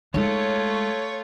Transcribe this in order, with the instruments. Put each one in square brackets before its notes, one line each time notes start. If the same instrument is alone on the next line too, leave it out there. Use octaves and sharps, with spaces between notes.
[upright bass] G#3 D#4 [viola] A3 F4 [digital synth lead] C#5